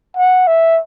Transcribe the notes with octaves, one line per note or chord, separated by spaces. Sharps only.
F#5
E5